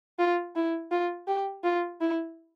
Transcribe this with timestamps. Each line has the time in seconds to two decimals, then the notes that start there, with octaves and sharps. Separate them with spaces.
0.19 F4
0.56 E4
0.91 F4
1.27 G4
1.64 F4
2.01 E4